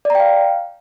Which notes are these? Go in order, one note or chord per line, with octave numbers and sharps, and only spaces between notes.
D5 F5 G5 A#5